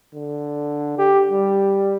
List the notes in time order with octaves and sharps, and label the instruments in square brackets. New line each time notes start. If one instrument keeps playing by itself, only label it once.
[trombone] D3
G4
G3